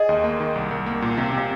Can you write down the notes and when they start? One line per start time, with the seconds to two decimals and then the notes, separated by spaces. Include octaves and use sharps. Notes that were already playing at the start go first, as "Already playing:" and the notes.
Already playing: G#4 D#5
0.09 D#2
0.24 A#3
0.40 D#3
0.56 C2
0.71 C2
0.86 A#3
1.02 A#2
1.17 C3 F5
1.32 C3
1.38 F5